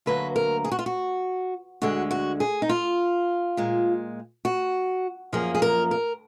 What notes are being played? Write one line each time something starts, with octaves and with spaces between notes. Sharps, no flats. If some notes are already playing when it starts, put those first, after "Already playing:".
D2 D3 F#3 A#3 B4
A#4
G#4
F#4
F4
F#4
D2 D3 G#3 F#4
F#4
G#4
D#4
F4
A#2 G#3
F#4
F#2 F3 A#3 G#4
G#4
A#4
A#4